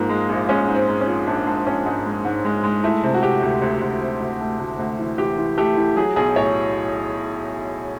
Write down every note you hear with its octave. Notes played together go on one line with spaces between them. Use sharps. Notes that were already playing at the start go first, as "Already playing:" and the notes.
Already playing: G#2 F3 A#3
G#3
A#1
G#3 C#4
G#2
C4
G#3
C#4
F3
A#1 D4
G#3 D4
A#1 C#4
G#2 D#4
G#3
G#2
G#3
G#3
A3 E4
C3
F#4
C3 G4
D2
D2
D2
C3
D2
A3
D2
D2
E3
E3 G4
E3
A3 G4
E3
F#3 G#4
B1 G#4
A2 C#5